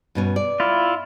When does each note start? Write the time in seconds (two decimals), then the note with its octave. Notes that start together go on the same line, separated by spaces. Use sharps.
0.15 G2 B2 C#4
0.36 D5
0.60 E4 F4